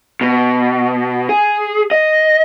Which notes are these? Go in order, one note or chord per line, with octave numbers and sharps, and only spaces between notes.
B2
G#4
D#5